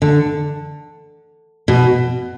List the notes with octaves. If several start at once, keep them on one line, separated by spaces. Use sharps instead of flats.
D3
B2